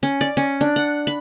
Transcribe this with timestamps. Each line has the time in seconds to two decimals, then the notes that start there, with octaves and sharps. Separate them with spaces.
0.03 C#4
0.21 D5
0.37 C#4
0.61 D4
0.76 F#5
1.07 B5